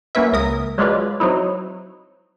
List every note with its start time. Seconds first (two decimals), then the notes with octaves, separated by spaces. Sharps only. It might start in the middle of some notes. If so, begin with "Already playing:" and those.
0.15 F#3 A#3 C#4 E4 B4 E5
0.33 C#2 A#4 D#6
0.78 F#3 G#3 C#4 D4 F4 B4
1.20 F#3 C4 D#4 E4